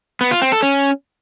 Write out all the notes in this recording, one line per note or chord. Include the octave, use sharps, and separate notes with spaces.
B3
F4
C4
A4
C#4